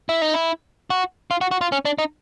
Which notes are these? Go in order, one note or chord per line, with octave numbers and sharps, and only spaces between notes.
E4
D#4
E4
F#4
F4
F#4
F#4
F4
C#4
D4
D#4